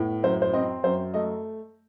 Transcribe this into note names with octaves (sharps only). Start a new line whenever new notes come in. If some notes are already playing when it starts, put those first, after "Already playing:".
Already playing: A2 B3
F#2 C5
C5
C4 D#5
F#2 C5
A3 D#5